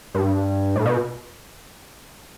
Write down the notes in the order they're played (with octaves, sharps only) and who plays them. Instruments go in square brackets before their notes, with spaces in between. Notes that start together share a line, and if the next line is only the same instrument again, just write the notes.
[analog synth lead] G2
A2
B2